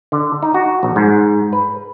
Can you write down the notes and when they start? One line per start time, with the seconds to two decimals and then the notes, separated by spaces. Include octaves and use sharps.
0.12 D3
0.43 D#4
0.54 F#4
0.83 A#1
0.96 G#2
1.53 B4